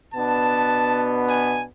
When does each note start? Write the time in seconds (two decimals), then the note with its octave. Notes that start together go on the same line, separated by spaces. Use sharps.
0.13 B2 B3 D4 A5
1.28 G#5